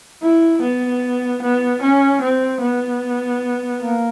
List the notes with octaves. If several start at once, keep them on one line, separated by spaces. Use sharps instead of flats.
E4
B3
B3
C#4
C4
B3
A#3